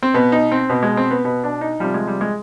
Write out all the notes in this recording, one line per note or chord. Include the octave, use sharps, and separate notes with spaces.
C4
B2 B3
D#4
C4
B2 B3
G#3
C4
B3
B2 B3
D4
D#4
C3 F3 G3
G#3
G3
G#3